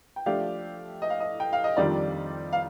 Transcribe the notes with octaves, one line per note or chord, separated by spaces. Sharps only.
G5
F3 A3 D4 G4 F5
D#5
F5
D#5
G5
F5
D#5
F2 D#3 G3 D4 F4 D5
F5